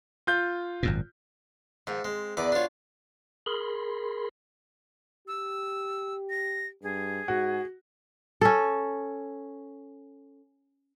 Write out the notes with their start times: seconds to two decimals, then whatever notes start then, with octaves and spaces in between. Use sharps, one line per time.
0.27 F4 G6
0.83 G#1 F#2 A#2
1.87 G#2 D#3 F3
2.05 G#3 C4
2.37 E2 A#4 B4 D5 D6
2.52 B3 D4 F4 F#4 C#5
3.46 G#4 A#4 B5 C6
5.28 G4 E6
6.30 A#6
6.83 G2 G#4
7.28 G#2 F#4
8.41 C#4 A4